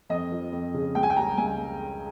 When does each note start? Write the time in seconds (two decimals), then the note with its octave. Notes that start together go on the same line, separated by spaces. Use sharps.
0.10 F2 D#5
0.32 F3
0.52 F2
0.74 C#3
0.95 C#2 G5
1.03 G#5
1.10 G5
1.16 G3 A#5
1.37 C#2 G#5